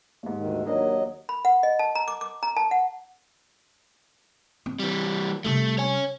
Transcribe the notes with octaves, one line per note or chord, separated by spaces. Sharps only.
D#2 G#2
D2 D#3
D#2 F#3 A#3 D4 D#4 D#5
B5
F#5
D#5
A5
A#5
D6
D6
A#5
A5
F#5
C4
E3 G3
C3 G3 A3
C#5 G#5